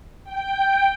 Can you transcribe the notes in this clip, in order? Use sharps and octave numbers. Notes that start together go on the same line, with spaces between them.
G5